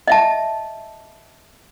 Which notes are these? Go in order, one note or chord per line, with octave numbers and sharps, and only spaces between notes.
D#5 E5 A5